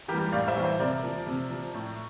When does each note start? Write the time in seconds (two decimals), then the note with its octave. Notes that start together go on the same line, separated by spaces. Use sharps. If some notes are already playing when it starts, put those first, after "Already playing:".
0.08 E3 G3 G4 A#4
0.32 A2 D5 F5
0.48 C5 E5
0.56 E3 G3
0.63 C5 E5
0.79 C3 A#4 D5
1.03 F3
1.27 C3
1.50 F3
1.74 A2